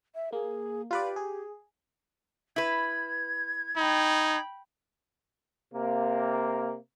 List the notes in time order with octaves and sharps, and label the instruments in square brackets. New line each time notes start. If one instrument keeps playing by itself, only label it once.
[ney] E5
[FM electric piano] A#3 [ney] G#4
[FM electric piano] F4 B4 D5 [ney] G4
[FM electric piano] G#4
[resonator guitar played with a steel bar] E4 B4 [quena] G#6
[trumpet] D#4 [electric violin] G5 B5
[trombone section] C3 A#3